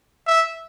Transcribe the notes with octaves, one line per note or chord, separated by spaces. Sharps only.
E5